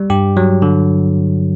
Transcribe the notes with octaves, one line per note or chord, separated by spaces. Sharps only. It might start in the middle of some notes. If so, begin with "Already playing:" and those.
Already playing: G3
G2 G4
F#3
D3